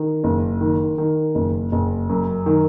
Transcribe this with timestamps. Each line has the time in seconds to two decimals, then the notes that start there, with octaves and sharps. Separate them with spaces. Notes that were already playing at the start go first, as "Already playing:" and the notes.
Already playing: D#3
0.24 F#1
0.61 D#3
0.98 D#3
1.35 F#1
1.72 F#1
2.09 F#2
2.46 D#3